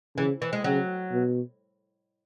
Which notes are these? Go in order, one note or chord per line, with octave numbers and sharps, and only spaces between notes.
C#3 E3
E3
G#3
C#3 F#3
B2